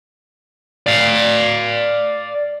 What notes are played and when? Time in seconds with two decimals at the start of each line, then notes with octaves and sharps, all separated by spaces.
0.86 D5 F5